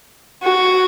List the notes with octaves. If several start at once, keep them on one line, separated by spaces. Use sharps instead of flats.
F#4